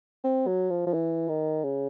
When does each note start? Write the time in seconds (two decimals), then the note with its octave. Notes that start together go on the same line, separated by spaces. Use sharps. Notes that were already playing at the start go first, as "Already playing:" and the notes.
0.24 C4
0.47 F#3
0.70 F3
0.87 F3
0.94 E3
1.29 D#3
1.64 C#3